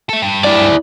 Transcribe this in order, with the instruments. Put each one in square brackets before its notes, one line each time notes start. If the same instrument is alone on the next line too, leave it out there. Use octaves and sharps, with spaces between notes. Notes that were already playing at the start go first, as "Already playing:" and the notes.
[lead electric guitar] A4 E5
G2
[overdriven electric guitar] E4 D5